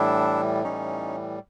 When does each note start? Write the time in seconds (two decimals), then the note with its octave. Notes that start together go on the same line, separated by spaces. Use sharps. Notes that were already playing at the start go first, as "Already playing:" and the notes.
Already playing: A2 E3 G3 D4 E4
0.64 A2 E3 G3 C#4 D#4